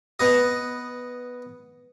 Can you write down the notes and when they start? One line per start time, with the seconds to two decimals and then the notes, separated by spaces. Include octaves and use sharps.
0.20 B3 B4 D#5